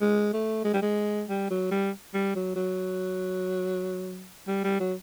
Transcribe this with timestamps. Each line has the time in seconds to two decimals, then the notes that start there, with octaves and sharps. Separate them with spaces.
0.01 G#3
0.33 A3
0.64 G#3
0.73 G3
0.82 G#3
1.29 G3
1.50 F#3
1.71 G3
2.14 G3
2.35 F#3
2.56 F#3
4.47 G3
4.64 G3
4.80 F#3